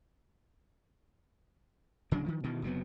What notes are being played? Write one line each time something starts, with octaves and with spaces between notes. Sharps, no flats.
D1 C#3 F#3 D4
D#3 F3
B2 D#3 E3
F#1 C3 F#3 B3